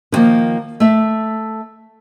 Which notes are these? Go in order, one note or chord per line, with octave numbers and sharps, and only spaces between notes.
D3 D#3 F3 A#3
A3 E5